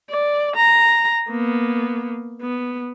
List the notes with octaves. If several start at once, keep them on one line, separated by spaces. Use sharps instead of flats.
D5
A#5
A#3 B3
B3